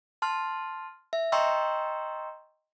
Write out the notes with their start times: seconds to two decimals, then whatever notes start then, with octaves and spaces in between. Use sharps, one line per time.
0.22 A5 C6 F6
1.13 E5
1.32 D#5 G5 A#5 C6 C#6 E6